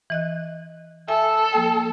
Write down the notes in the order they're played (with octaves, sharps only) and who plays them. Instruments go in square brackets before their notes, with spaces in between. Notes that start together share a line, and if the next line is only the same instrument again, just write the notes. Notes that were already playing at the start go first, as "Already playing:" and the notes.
[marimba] E3 D#5 F#6
[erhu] A4 [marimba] E5 G#5
[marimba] F3 A#3 G5